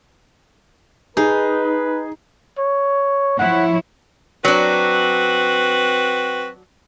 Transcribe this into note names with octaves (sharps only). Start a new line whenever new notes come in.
D#4 G#4 B4
C#5
F3 E4 C#5 F#5
F#3 C4 D4 F#4 B4